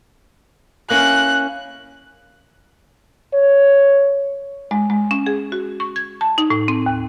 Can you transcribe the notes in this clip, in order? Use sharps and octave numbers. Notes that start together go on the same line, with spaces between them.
A#3 C#4 E4 F#6
C#5
G#3
G#3
C#4
G#4
F#4
C#6
G#6
A5
D#4
A2
C4
D#2